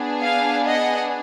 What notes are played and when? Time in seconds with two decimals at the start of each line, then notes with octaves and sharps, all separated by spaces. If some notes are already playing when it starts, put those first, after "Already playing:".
Already playing: B3 D4 G#4
0.22 F5 G#5
0.67 D#5 F#5